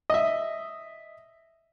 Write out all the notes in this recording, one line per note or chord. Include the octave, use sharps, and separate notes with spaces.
D#5 E5